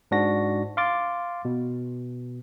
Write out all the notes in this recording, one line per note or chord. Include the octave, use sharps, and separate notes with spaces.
G#2 D4 F#4 A#6
F5 C6 D6 A6
B2